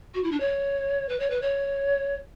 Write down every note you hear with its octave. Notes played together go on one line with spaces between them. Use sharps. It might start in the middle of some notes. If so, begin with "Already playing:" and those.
F#4
E4
D4
C#5
B4
C#5
B4
C#5